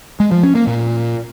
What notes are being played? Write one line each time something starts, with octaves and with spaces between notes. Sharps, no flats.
G#3
F3
C#4
A#3
A#2